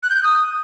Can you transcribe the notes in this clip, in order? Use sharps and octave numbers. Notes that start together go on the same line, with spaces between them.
F#6
G6
F#6
D#6